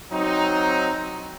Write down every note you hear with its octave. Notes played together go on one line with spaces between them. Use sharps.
F#3 C4 D#4